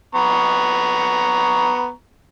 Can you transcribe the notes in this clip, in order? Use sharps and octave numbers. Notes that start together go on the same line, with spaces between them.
B3 A#5 C#6